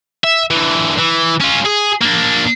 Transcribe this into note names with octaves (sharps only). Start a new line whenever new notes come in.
E5
D3 E3
E3
C#4 F4
G#4
A#3 D4